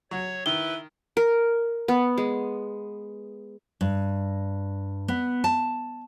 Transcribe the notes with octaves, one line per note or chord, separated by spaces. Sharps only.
F#3 C#5
D#3 E4 B4 G7
A#4
B3
G#3
G2
B3
A5